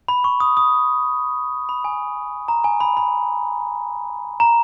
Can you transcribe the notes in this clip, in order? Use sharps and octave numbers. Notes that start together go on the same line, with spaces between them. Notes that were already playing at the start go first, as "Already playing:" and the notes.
B5
C#6
D#6
D#6
B5
G#5
A#5
G#5
B5
B5
A#5